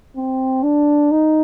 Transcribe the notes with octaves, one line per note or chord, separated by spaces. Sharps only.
C4
D4
D#4